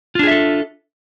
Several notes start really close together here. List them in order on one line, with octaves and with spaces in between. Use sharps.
F4 D4 G#4 E5 A4